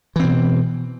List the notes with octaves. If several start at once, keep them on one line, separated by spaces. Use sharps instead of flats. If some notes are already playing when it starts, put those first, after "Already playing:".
B2 E3 C4